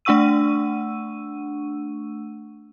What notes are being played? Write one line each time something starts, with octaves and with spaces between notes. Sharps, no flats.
A3 D4 F#5 C#6 E6 D#7